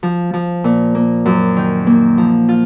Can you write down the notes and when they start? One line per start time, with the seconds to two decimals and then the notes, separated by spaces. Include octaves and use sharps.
0.03 F3
0.34 F3
0.64 A#2
0.95 A#3
1.25 F#2
1.57 D#3
1.87 A#3
2.18 F3
2.49 F4